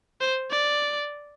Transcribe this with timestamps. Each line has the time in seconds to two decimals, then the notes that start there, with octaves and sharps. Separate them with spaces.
0.21 C5
0.51 D5